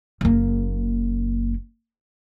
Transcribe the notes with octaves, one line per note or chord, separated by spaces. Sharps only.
F#1 A#3